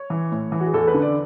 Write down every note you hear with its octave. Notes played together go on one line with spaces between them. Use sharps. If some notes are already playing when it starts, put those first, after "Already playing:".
Already playing: C#5
E3
A2
E3
F#4
G#4
E2 A4
B4
D3
D5